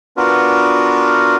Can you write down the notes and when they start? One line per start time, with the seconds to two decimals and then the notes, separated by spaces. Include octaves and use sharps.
0.17 B3 D4 F4 F#4 A#4 B4